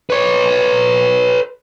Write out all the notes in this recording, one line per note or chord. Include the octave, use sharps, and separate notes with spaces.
B4 C#5